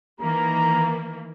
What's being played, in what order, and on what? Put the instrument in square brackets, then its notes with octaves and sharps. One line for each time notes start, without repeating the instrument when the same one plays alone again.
[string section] D#3 E3 A#3 [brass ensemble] A#5